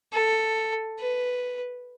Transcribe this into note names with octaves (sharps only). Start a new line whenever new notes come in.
A4
B4